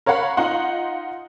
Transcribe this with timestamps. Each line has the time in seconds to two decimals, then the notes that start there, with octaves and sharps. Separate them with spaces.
0.06 A#4 C#5 F5 F#5 B5
0.37 D#4 F4 F#5 C6